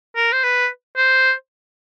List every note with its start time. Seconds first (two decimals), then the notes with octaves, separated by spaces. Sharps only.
0.16 A#4
0.32 C5
0.43 B4
0.96 C5